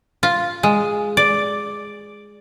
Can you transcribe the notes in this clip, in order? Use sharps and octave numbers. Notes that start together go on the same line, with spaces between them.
F4
G#3
D5